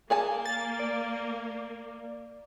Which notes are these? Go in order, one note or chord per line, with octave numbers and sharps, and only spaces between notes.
A#3 G#4 G#5 A5
A6
D5